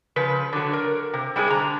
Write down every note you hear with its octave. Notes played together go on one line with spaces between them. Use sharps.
C#3 F3 B4
D3 F#3
A#4
C3
G3 G#3 C4 G#4
D3 A#5